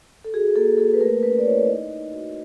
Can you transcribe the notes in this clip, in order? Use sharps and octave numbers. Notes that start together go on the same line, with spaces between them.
A4
F#4 G#4
A#3 A4
A#3 A4
B4
A3 A#4
C#4 B4
D5
E4 C#5
D#4 D#5
D#4
F#4